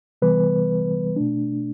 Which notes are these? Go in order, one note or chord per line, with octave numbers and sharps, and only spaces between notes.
C3 E3 G3 B3 B4
B2 A3 D4